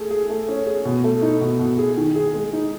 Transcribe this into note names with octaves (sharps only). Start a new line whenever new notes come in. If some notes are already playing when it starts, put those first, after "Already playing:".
Already playing: A3 G#4
G#4
A3
C#4
G#4
B2
A3
D#4
B2
B2
G#4
D#3
G#4
G#3
D#4